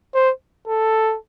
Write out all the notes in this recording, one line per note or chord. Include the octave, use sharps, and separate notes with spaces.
C5
A4